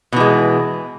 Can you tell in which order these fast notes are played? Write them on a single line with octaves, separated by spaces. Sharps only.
B2 E3 G#3